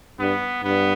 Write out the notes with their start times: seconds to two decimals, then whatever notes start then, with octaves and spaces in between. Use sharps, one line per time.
0.19 G2 B3
0.64 G2 B3